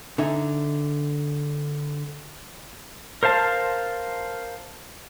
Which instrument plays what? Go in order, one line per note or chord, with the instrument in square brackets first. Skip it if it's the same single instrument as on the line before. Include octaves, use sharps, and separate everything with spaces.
[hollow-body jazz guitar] D3 D#4 E5 G#5
[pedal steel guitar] A#4 C5 F5 A5